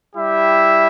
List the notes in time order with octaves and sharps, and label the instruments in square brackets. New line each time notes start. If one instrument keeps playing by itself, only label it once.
[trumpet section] G3 E4 G4 E5